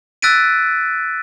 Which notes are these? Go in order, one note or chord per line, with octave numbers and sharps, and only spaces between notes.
E6 F#6 A6 B6 D7 D#7